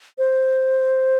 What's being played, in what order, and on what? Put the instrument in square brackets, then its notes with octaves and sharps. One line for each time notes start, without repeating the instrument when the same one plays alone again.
[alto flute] C5